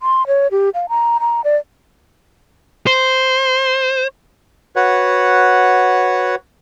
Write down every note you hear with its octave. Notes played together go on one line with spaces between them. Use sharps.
C6
C#5
G4
F5
A#5
A#5
D5
C5
F#4 B4 C#5 F#5